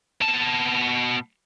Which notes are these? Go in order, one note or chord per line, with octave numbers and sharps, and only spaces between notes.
B2 A5